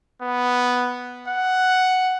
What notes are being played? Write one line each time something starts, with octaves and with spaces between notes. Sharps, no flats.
B3
F#5